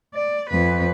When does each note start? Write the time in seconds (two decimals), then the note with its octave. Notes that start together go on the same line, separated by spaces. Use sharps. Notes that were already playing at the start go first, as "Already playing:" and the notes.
0.14 D5
0.49 F2 B4